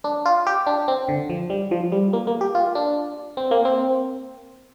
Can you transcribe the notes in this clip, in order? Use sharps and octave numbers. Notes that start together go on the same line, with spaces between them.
D4
F4
G4
D4
C4
D3
F3
G3
F3
G3
A#3
A#3
G4
F4
D4
C4
A#3
C4